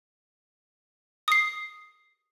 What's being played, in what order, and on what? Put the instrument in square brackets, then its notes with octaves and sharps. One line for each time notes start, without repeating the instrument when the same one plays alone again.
[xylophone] D#6 C7